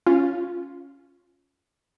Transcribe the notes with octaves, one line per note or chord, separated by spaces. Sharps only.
C#4 F4